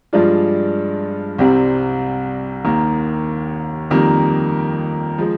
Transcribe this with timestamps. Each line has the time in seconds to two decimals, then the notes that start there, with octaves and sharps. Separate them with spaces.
0.13 G2 F3 G#3 D4 F4
1.39 C2 C3 G3 C4
2.65 D#2 D#3 A#3
3.91 F2 D#3 G3 A#3
5.18 F3 G#3